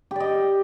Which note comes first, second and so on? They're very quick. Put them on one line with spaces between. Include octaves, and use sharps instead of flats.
G4 D5 D#5